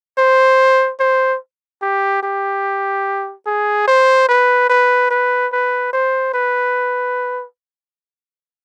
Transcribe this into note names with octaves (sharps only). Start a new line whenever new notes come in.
C5
C5
G4
G4
G#4
C5
B4
B4
B4
B4
C5
B4